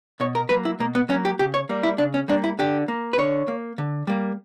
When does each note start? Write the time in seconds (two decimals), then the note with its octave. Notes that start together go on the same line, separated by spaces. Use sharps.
0.20 B2 C#5
0.35 A#4
0.49 F#3 A#3 B4
0.65 E4
0.79 B2 A#3
0.95 B3
1.09 F#3 C#4
1.13 A#3
1.25 G4
1.39 C#3 G4
1.54 C#5
1.69 G3 A#3
1.83 E4
1.98 C#3 D4
2.14 C#4
2.28 G3 A#3 D4
2.44 E4
2.59 D3 G4
2.88 A#3
3.13 B4
3.18 D3 C#5
3.48 A#3
3.78 D3
4.07 G3 A#3